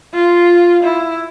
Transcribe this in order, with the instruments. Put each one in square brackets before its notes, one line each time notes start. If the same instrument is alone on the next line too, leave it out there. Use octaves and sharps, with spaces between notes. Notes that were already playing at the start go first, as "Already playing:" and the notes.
[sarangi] F4
E4